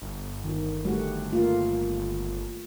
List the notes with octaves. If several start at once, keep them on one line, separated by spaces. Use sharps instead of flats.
G1
D#3
G3 A3 F#4
A3 A#3 F4